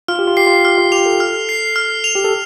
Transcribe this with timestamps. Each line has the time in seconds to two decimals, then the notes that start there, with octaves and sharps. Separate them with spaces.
0.08 F4 F6
0.19 G4
0.27 F4
0.37 G4 C7
0.47 F4
0.65 G4 F6
0.78 F4
0.92 G4 F7
1.06 A4
1.20 F6
1.49 C7
1.76 F6
2.04 F7
2.15 G4
2.24 A4